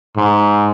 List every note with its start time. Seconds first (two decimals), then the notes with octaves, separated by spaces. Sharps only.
0.17 G#2